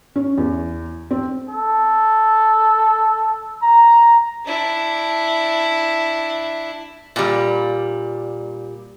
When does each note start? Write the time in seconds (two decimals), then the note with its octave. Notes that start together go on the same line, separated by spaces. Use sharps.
0.16 C#4
0.38 E2
1.11 C4
1.49 A4
3.62 A#5
4.45 D4 E4
7.16 A#2 G3